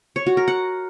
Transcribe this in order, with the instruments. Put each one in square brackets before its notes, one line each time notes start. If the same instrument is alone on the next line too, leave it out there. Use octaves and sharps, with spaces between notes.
[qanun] C#5
F#4
A#4
F#5